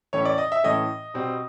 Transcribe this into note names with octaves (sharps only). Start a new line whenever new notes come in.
A2 E3 A3 C#4 C#5
D5
D#5
E5
A2 E3 A3 C#4 D#5
B2 G3 C4 D#4